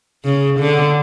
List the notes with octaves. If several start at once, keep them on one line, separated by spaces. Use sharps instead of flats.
C#3
D3